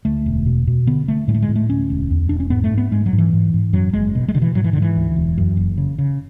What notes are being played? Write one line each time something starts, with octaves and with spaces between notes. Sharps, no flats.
D2 A3
E1
B2
B2
D3 B3
D3 A3
A2 G#3
A3
G#3
A2
A3
D2 C#4
E1
E2
E1 D4
C#4
G#2 B3
A3
G#2
B3
G#2 G#3
F#3
G#2
E3
G#2
G#2
F#2 F#3
F#1 G#3
B2
G#3
B2 D3
E3
G#2 F#3
E3
G#2 D3
E3
D2
E1
F#2
F#1
C#3
C#3